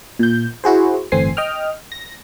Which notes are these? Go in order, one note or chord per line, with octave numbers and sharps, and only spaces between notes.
A#2 G6
E4 F#4 G#4 C5
G1 A2 E3 C4 G#5 C7
D#5 G5 F6
A#6